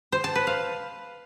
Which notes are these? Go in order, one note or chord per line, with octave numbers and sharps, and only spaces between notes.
C5
A5
B4
F5